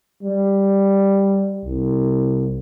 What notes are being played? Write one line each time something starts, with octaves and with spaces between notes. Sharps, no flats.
G3
C2